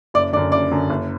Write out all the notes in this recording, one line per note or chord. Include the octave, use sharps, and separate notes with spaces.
F#1 D5
F#2 D3 D5
F#1 D5
F#2 D3
F#1